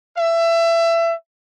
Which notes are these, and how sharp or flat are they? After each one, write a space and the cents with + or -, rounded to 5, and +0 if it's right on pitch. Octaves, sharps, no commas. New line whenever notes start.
E5 +25